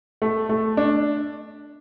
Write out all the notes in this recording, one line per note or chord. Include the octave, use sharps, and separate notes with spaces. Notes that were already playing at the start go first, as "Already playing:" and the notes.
A3
A3
D4